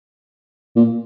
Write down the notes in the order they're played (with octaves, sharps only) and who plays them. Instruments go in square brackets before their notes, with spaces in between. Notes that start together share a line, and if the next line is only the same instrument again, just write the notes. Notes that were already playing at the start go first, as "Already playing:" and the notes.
[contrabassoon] A#2